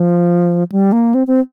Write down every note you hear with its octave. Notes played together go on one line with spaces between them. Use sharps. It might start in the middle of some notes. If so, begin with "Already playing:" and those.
Already playing: F3
G3
A#3
C4
C4